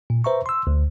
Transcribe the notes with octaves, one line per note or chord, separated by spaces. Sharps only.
A#2
B4 C5 E5 A#5 C#6
C6 E6
D2